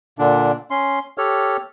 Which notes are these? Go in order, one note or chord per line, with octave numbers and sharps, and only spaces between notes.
A#2 D3 D4
C#4 C6
G4 A4 C#5 F6